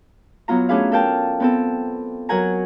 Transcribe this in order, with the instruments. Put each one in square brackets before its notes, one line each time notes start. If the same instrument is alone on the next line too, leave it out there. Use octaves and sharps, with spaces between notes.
[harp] F#3 B3 F4 A#5
A3 C#4 D4 G#4 B4 F5
A4 A#4 F5 G5 A5
B3 C4 A4
F#3 A#4 F#5 G#5 A#5